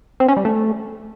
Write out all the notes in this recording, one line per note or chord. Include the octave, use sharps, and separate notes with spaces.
C4
C#4
G3
A3